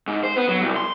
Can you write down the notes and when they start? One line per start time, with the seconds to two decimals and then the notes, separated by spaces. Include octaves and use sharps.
0.07 G#2
0.23 C5
0.36 B3
0.49 F#3
0.61 C2
0.76 C6